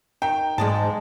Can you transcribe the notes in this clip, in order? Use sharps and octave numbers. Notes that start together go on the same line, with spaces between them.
D#3 G5
G#2 G#3 D5 D#5 A5